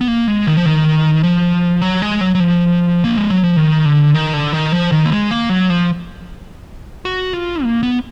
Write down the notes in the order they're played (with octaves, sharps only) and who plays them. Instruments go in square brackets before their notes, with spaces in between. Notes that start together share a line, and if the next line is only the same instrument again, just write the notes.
[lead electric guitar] B3
A#3
G#3
D#3
F3
D#3
F3
F#3
G#3
F#3
F#3
F3
A#3
G#3
F#3
F3
D#3
D3
D#3
D3
D#3
F3
D#3
A#3
G#3
A#3
F#3
F3
F#4
F4
A#3
B3